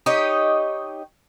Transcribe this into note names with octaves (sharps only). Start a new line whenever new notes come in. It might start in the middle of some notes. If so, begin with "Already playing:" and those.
D#4 G4 C#5 D#5